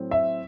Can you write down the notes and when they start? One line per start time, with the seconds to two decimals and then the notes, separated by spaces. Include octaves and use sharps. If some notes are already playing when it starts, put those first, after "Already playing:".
Already playing: A2 F#3 C4
0.11 E5